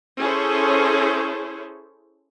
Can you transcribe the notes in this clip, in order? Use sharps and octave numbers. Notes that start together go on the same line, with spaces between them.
C#4 E4 G#4 A4 C5 C#5